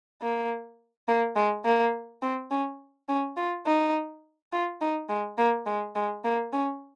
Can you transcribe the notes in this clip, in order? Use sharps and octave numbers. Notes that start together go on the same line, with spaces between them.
A#3
A#3
G#3
A#3
C4
C#4
C#4
F4
D#4
F4
D#4
G#3
A#3
G#3
G#3
A#3
C#4